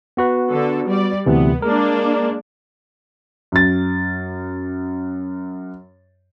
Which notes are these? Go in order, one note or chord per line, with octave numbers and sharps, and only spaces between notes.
B3 F#4 B4
D3 A4
G3 D5
D2 C3 E3 B3
G#3 A#3 D4 A#4
F#2 A6